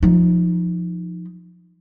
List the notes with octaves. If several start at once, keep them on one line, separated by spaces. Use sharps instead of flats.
F3 D#4